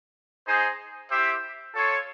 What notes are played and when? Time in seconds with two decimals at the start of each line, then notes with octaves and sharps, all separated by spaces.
0.46 D#4 G#4 C5
1.10 E4 G4 C5 E5
1.74 F4 A4 C#5